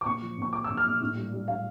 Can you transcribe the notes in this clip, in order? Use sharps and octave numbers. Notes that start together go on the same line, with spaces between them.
D6
A#2 C#6
F3
A#2 C#6
F3 D6
E6
A#2
F6
A#2
A2
G3
G3
G3 F5